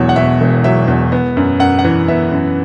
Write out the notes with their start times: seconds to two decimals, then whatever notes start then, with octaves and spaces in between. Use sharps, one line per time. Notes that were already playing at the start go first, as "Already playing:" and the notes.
Already playing: E1 E2 B2 F#3 C#5
0.09 F#5
0.16 B2 E5
0.41 E1
0.64 F#3 E5
0.88 E2
1.12 B3
1.37 F#2
1.59 F#2 F#5
1.79 F#5
1.85 E3
2.08 B3 E5
2.32 F#2